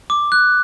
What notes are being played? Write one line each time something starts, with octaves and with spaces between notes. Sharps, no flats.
D6
F#6